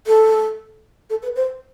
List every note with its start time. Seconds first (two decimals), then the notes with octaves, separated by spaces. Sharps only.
0.07 A4
1.10 A4
1.23 B4
1.36 C5